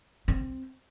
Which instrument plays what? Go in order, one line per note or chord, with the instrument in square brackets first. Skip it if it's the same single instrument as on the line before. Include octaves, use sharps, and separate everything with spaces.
[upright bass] C4